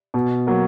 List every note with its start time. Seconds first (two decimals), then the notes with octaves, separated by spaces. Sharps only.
0.14 B2
0.47 F#3 A#3